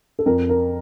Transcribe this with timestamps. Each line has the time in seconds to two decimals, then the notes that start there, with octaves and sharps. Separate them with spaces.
0.19 A4
0.26 F2 A#4
0.49 A#4